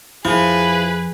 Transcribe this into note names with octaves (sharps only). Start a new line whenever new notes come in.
F2 F3 E4 G#4 B4